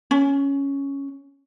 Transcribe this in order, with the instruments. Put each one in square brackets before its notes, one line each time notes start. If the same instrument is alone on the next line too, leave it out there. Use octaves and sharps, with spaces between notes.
[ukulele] C#4